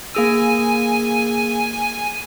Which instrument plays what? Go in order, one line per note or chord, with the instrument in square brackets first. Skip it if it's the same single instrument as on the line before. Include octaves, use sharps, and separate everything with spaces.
[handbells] A#3 G#4 E6 [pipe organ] G#5